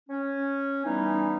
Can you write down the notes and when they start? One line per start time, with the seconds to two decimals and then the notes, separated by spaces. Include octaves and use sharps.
0.09 C#4
0.84 E3 G3 B3 D#4